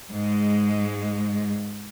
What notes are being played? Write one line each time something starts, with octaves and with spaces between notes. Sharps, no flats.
G#2 G#3